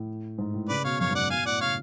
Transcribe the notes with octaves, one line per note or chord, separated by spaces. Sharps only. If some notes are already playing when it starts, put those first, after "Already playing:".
Already playing: A2
G#2
A2
C#3 B4 D5
B2 C#5 F5
F#2 C#5 F5
G#2
B2 D5 F#5
B2 F5 G#5
A2 D5 F#5
C#3 C#5 F5